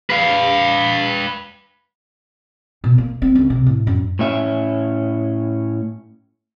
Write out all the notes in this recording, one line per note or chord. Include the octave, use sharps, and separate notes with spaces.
B4 F5
B2
A#3
C4
C#2
C3
A2
F#2
A2 C#4 E5